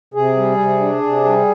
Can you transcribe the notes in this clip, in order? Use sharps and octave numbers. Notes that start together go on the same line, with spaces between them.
C3 G#4
G3
C3
D4
C3
G3